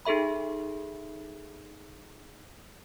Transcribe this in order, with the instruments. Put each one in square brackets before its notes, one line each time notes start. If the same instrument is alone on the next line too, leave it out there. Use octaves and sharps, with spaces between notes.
[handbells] D#4 G#4 A4 E5 B5